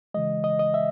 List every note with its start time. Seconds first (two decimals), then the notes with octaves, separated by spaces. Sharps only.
0.14 C#3 E3 G#3 D#5
0.44 D#5
0.59 D#5
0.74 E5